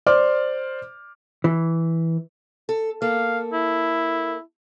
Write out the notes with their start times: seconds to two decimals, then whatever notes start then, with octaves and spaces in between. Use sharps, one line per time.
0.06 C5 D5 C6 D6 F6
1.44 E3
2.69 A4
3.02 A#3 A4 F5
3.53 E4